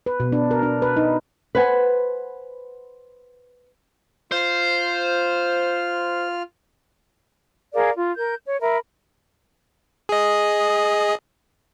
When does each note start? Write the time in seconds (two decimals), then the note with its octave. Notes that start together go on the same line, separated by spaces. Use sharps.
0.06 B4
0.20 B2
0.32 D4
0.51 A#4
0.63 D4
0.82 B4
0.97 D#4
1.55 B4 C5 F#5 G#5
4.31 F4 C5 F6
7.73 G#4 A#4 D5 F5
7.96 F4
8.16 A#4 G6
8.44 C#5
8.61 A#4 E5 B5
10.09 G#4 D#5